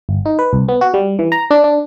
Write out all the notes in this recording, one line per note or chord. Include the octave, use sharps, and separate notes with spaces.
G1
D#4
B4
C2
B3
F#4
G3
E3
A#5
D4
D4